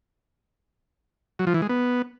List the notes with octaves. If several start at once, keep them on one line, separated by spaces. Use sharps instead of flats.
F#3
F3
E3
G#3
B3